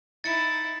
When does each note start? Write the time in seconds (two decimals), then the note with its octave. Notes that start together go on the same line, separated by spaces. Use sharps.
0.24 D#4 E4 A6 C#7